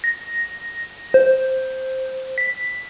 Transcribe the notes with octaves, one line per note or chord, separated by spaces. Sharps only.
A#6
C5
B6